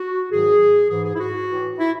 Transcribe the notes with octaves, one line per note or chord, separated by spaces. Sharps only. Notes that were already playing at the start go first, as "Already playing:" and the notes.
Already playing: F#4
G#2 D#3 F#3 G#4
G#2 E3 G#4
G#4
E4
F#4
A2 E3
E4